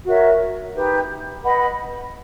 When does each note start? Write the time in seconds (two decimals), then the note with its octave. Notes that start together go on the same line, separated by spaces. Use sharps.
0.05 F#4 A#4 C#5 E5
0.74 D#4 G4 B4
1.42 B4 D#5 F#5 B5